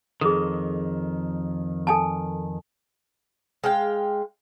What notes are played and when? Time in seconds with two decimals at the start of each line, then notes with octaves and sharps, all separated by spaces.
0.21 F2 D#3 G#4 A4
1.87 A4 G#5 A5
3.64 G#3 F5 G5